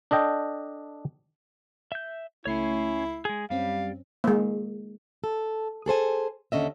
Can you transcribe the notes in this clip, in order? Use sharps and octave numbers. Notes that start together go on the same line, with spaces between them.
D4 A4 D#5 G5
E5 G6
C#2 A3 C#4 E4 C#5 C7
G#3 G#4
F#2 G3 C4 C#4 F5
G#3 A#3
A4
G#4 A4 C5 G#5
D#2 D3 C#4 D#5 E5